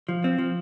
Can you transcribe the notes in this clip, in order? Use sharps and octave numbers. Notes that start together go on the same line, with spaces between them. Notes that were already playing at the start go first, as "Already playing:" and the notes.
F3
C4
F3